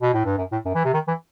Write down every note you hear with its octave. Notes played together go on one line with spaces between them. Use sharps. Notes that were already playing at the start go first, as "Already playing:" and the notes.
B2
A2
G2
F#2
A2
F#2
E3
C3
D#3
E3